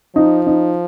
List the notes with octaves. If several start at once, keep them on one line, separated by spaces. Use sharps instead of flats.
F3 D#4
D#4